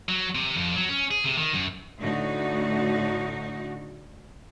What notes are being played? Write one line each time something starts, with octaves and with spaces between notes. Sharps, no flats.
F#3
C3
F2
F#3
C#4
G#4
C3
D#3
F#2
A2 D3 D#4 F#4